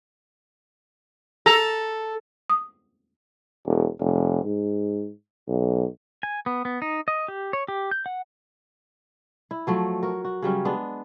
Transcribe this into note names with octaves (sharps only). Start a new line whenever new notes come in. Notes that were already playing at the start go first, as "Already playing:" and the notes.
A4 A#5
D#6
E1
F1
G#2
B1
G#5
B3
B3
D#4
D#5
G4
C#5
G4
G6
F#5
E4
F3 F#3 A3
F#4 A#4
F#4
C#3 F#3 G3 C#4
G#3 B3 D4